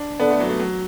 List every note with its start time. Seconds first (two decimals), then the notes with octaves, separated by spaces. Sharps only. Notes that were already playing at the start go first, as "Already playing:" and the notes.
Already playing: D4
0.19 D3 B3
0.30 A3
0.40 F#3
0.50 A3
0.60 F#3